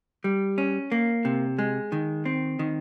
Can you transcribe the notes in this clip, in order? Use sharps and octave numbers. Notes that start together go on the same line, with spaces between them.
G3
C#4
A#3
C3
G#3
D#3
C4
D#3